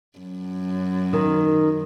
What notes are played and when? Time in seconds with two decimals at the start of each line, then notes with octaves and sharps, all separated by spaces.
0.18 F#2
1.13 D#3